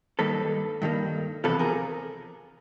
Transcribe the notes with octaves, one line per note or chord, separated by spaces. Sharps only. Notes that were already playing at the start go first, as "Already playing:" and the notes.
G2 D#3 G3 A#3 A4 B4
G2 D#3 G3 A#3
E2 C3 F3 A4 B4
G#4 A#4